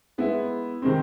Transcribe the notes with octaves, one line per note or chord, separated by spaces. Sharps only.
G#3 B3 E4
C3 D#3 G#3 C4